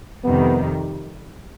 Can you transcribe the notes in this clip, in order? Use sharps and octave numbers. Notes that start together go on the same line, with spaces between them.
F2 C3 D#3 G3 B3